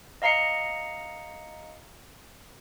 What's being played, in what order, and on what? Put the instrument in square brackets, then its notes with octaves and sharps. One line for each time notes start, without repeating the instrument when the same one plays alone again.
[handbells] D#5 F5 A#5 C7 C#7